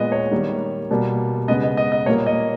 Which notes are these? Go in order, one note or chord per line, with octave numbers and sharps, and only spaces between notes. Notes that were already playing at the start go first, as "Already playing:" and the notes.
Already playing: A#2 G#3 B3 D#5
C#5
D#3 G3 A#3
B2 G3 A#3
C#3 G#3 B3 D#5
D#5
D#5
D#5
A#2 G3 A#3 C#5
D#5